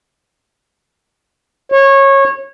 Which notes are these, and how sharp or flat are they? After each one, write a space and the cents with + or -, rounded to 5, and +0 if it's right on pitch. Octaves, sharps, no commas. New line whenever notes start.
C#5 -20